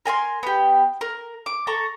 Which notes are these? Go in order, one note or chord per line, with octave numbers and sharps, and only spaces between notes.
A#4 G#5 A#5 C6
B3 G4
A#4
D6
A4 A5 A#5 C#6